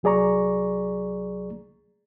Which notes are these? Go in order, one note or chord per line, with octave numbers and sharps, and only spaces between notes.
C2 F#3 G#4 D5 A#5 C#6